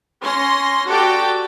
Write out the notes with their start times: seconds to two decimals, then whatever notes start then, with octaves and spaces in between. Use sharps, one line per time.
0.21 C#4 C6 A#6
0.87 F#4 G4 A4 D5 G5